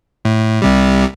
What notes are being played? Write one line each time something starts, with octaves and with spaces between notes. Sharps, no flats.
A2
C2 C3 G3